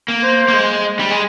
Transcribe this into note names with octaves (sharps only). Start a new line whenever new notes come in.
A#3
C5
A#3
G#3
G3
G#3